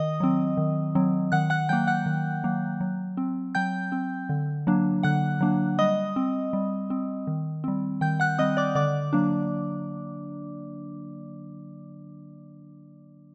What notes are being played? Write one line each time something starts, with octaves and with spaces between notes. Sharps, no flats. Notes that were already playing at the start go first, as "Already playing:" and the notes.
Already playing: D#3 D#5 D#6
F#3 C4
D#3
F#3 C4
D#3 F#5 F#6
F#5 F#6
F#3 A#3 G5 G6
F#5 F#6
D#3
F#3 A#3
F#3
C4
F#3 G5 G6
C4
D3
F#3 A#3 D4
D3 F#5 F#6
F#3 A#3 D4
G3 D#5 D#6
C4
G3
C4
D#3
G3 C4
D#3 G5 G6
F#5 F#6
G3 C4 D#5 D#6
D5 D6
D3 D5 D6
F#3 A#3 D4